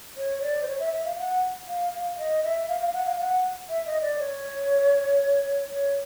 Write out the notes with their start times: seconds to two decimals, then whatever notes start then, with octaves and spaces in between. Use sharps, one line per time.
0.17 C#5
0.42 D5
0.62 C5
0.68 C#5
0.80 E5
0.93 E5
1.05 F5
1.18 F#5
1.68 F5
1.94 F5
2.18 D#5
2.43 E5
2.69 F5
2.81 F5
2.94 F#5
3.06 F5
3.19 F#5
3.69 E5
3.86 D#5
4.02 D5
4.19 C#5
5.70 C#5